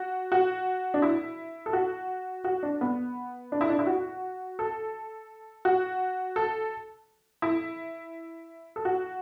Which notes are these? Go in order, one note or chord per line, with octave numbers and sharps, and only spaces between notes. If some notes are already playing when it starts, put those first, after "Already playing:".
Already playing: F#4
F#4
D4
E4
A4
F#4
F#4
D4
B3
D4
E4
D4
E4
F#4
A4
F#4
A4
E4
A4
F#4